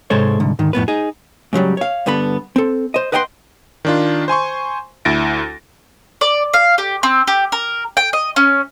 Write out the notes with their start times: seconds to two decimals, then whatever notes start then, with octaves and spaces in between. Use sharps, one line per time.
0.10 G#2 C3 G#3 A4 C5 C#5
0.40 C2 G#2 D3
0.59 D2 G#2 D#3
0.73 F2 A2 B3 B4
0.88 D#4 G#4
1.53 G#2 C#3 F#3 G3
1.77 C#5 F5
2.06 G2 D3 B3 A4 B5
2.56 C4 A4
2.94 C5 D#5
3.12 B4 D#5 F#5 G5 A5 C6
3.85 D#3 D4 F4
4.28 C5 G#5 C6 C#6
5.05 D2 E4 A6 A#6 D7
6.21 D5
6.54 F5
6.78 G4
7.03 C4
7.27 G4
7.52 A#4
7.97 G5
8.13 D#5
8.36 C#4